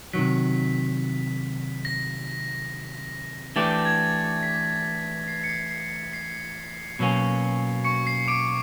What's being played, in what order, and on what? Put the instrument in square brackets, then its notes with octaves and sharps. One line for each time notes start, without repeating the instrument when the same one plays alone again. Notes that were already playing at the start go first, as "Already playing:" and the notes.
[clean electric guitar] C3 D#3 F#3 [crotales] B6
[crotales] A#6
[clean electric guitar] E3 A3 D4 G4 [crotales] A6
[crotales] G#6
B6
C7
C#7
C7
C7
C7
[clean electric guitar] B2 F#3 A#3 C#4
[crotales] C#6 C#7
C7
D6 D7